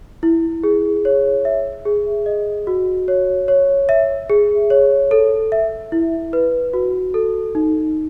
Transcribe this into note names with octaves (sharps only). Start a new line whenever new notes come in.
E4
G#4
C#5
E5
G#4
D#5
F#4
C#5
C#5
E5
G#4
C#5
A4
E5
E4
B4
F#4
A4
D#4